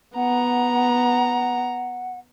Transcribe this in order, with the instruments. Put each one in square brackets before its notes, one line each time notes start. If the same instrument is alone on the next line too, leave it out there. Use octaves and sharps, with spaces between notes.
[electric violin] B3 A#5 [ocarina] F#5